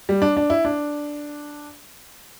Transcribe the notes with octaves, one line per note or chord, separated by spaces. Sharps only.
G3
D4
D4
E4
D4